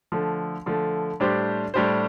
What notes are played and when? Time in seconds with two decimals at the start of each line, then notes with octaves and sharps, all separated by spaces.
0.12 D3 F3 A3
0.66 D3 F3 A3
1.20 A2 G3 D4 G4 C5
1.74 A2 G3 D4 G4 C5